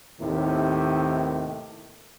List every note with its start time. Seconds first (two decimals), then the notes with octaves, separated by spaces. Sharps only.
0.21 D#2 A2 C3 D#3